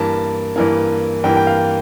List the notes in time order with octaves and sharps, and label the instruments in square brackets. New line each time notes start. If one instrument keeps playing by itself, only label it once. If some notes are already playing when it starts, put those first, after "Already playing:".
Already playing: [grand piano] G2 E3 A#3 A5
G2 E3 A#3
G2 E3 A#3 G5
G5
F5